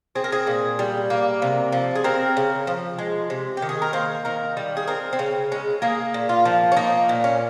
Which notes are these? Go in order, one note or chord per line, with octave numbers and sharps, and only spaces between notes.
C4 G#4
A#4
G#4
A#2
G3
A#3
C3
F3
G#4
C4 A#4
C#3
F3
G#3
C3
G4
D#3
G#4
A#4
A#3 C5
D#3 A#4
G3
G#4
C4 A#4
C4
C#3 C#4
G#3 C#4
A#3 G#4
A#2
F4
F3
C#4
A#3 D#4
A#2
C#4